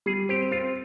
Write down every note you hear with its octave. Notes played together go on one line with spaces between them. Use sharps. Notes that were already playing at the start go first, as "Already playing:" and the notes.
G3 G#4
C4 G4
C4 F4